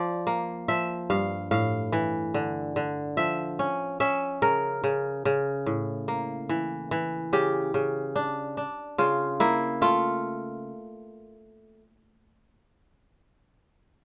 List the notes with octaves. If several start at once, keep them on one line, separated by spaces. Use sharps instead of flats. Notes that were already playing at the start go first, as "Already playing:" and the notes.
Already playing: F3 D5
A#3
F3 E5
G2 F5
A2 F5
E3
D3
D3
F3 E5
C#4
C#4 E5
C#3 A#4
C#3
C#3
A2
A#3
E3
E3
C#3 G4
C#3
D4
D4
C#3 F4
A#3 E4
A3 F4